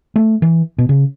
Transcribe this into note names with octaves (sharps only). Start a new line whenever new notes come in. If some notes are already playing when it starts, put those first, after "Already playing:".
A3
E3
B2
C#3